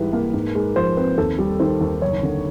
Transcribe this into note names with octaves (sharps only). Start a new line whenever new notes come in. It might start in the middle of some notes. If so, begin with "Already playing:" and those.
Already playing: G#2 E3 G3 B4
A#3
G#2
G#3
F3 C5
C4 B4
D#2 A4
G3
D#3 C5
D#2
F#1 C#5
D3